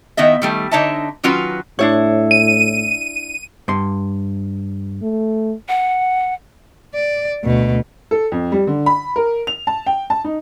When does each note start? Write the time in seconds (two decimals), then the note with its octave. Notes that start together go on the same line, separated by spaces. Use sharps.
0.17 D#3 B3 E4 D#5 E5
0.42 D#3 G3 A3
0.71 D3 D#4 C#5 D#5 E5 A5
1.23 D#3 F#3 C#4 F4 F#4 B4
1.79 A2 D4 E4 C#5
2.31 D#7
3.68 G2 C6
5.03 A3
5.68 F#5
6.95 D5
7.44 D2 B2
8.11 A4
8.32 F2
8.52 G3
8.67 D3
8.86 B5
9.16 A#4
9.47 F7
9.67 A5
9.86 G5
10.10 A5
10.24 D#4